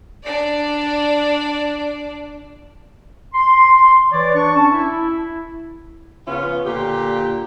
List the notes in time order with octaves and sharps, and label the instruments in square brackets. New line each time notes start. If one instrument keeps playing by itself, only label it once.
[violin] D4 D5
[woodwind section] C6
E3 B4 C#5 D5
D4 C#6
C#4 A5
E4
[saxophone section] C#3 F3 B3 C#4 F4
A#2 D3 F4 G4